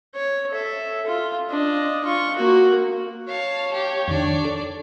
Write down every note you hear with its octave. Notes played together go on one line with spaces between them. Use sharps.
C#5
A4 E5
F4
D4 D#5
F4 C#6
A#3 F#4
C#5 F5 A5
G4
F2 D#3 D4 D5
A4